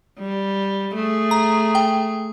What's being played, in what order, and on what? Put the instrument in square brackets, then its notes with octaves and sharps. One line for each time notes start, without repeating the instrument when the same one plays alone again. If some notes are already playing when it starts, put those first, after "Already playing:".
[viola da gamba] G3
A3 G#4
[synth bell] A#5
G5